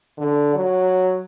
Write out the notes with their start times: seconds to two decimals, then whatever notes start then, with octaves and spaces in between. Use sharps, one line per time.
0.18 D3
0.55 F#3